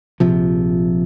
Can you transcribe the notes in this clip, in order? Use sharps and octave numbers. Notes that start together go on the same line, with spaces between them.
A#1 C3 F3